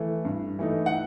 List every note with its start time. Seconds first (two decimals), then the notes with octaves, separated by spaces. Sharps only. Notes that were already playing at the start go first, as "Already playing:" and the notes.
Already playing: E3 A3
0.25 G2
0.59 E3 A3 D#4
0.86 F#5